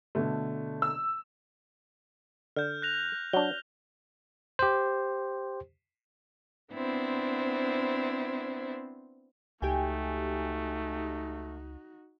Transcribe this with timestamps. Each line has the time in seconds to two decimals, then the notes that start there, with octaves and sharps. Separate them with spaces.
0.15 B2 D3 A3
0.82 E6
2.56 D3 F6 G6
2.82 F#6 A#6 F7
3.33 F#3 D4 G7
4.59 G4 C5
6.73 B3 C4 D4 E4 C5
9.62 C#2 A3 D#4 F#4 G4 G5 G#5